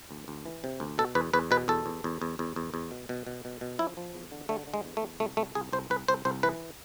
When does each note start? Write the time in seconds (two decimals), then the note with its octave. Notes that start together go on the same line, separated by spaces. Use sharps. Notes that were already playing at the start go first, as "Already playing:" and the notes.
0.11 D2
0.28 D2
0.46 E3
0.64 C3
0.80 D2
0.98 B2 A4
1.15 E2 B4
1.33 E2 B4
1.51 B2 B4
1.68 E2 A4
1.86 E2
2.04 E2
2.22 E2
2.39 E2
2.56 E2
2.74 E2
2.91 B2
3.09 B2
3.27 B2
3.45 B2
3.61 B2
3.79 F3 E4
3.97 F3
4.14 E2
4.32 D3
4.49 D3 A3
4.67 D3
4.74 G#3
4.85 E2
4.97 A3
5.02 E2
5.20 C2 A3
5.37 C2 A3
5.55 C2 G#4
5.73 C2 C5
5.90 C2 B4
6.08 C2 C5
6.25 C2 C5
6.43 E3 B4